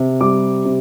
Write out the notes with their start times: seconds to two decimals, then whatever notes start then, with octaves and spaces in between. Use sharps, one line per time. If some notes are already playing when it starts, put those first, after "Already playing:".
Already playing: C3
0.21 G3 D6
0.65 C3